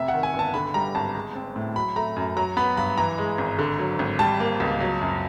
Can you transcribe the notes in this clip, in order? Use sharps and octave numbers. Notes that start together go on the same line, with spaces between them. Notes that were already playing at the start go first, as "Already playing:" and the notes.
Already playing: F1 C3 E5
D#3 F#5
G#5
G1 A5
D3 B5
G3 A#5
G#1 A5
G#3
C4
A2
F#3 B5
A3 A#5
F#2
F#3 A#5
B3 B5
G2 B5
E3 A#5
G#3
G#1
D3
F#3
G#1
G3 A5
A#3
C#2
F#3
F#2